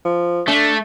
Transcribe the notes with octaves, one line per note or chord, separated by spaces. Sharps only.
F3
A3 D4